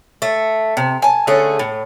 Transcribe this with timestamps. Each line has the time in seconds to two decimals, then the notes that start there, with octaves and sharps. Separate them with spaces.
0.22 A3
0.77 C3
1.02 G#5 A5
1.27 D3 A3 C#4 G#4
1.59 A2